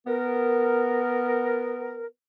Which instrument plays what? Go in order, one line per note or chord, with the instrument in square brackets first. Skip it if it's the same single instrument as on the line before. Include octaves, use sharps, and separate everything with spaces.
[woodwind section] B3 A#4